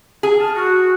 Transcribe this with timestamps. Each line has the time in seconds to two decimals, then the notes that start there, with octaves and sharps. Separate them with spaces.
0.23 G#4
0.40 A5 F6
0.55 F#4